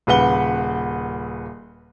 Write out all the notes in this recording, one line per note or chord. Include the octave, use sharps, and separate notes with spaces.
D#1 C#3 B4 F#5 G7